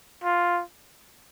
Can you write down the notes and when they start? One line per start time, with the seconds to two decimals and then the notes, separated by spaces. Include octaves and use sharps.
0.23 F4